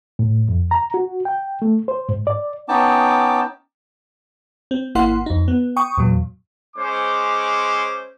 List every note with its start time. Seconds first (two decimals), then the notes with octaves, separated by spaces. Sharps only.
0.19 A2
0.49 F2
0.71 A#5
0.94 F#4
1.25 G5
1.62 A3
1.88 C5
2.09 G#2
2.27 D5
2.69 B3 C#4 D#4 G5 A5 D6
4.71 C4
4.95 G#1 A#3 E4 F#5 C6
5.26 F2 D#4
5.48 B3
5.76 G5 C#6 D#6
5.98 E2 A#2 F#3
6.76 G#3 C#4 C5 D6